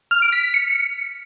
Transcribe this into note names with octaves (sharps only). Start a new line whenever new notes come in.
F6
D7
B6
B6
C#7